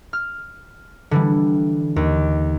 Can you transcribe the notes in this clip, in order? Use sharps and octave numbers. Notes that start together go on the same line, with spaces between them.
F6
D3 E3 G3
D#2